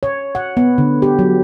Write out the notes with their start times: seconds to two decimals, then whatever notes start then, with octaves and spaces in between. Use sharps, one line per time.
0.03 C#5
0.35 F#5
0.57 B3
0.78 D3
1.02 G4
1.19 F#3